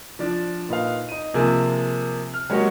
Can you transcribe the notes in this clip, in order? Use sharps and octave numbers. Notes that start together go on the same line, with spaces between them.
F3 D4 D5
A#2 D#4 B4 F5
D#4 D#7
C3 F3 A#3 G#4
F6
F#3 G#3 A#3 C#4 F#4 G4